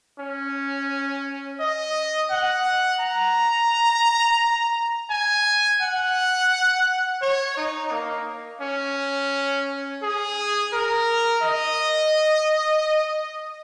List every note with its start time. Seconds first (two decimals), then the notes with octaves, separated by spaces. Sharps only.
0.19 C#4
1.60 D#5
2.30 F#5
3.00 A#5
5.10 G#5
5.81 F#5
7.22 C#5
7.57 D#4
7.91 A#3
8.62 C#4
10.03 G#4
10.73 A#4
11.42 D#5